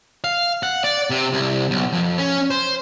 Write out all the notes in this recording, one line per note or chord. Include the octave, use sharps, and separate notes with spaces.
F5
F#5
D5
C3
C2
B1
F2
C#4
C5